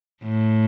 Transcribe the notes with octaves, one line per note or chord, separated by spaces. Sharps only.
A2